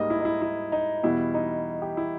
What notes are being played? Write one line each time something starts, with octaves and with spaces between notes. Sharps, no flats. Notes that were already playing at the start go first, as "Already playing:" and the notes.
Already playing: G#2 G3 A#3 D#5
E4
D#4
E4
E4
D#4
E2 B2 G3 E4
D#4
G4
E4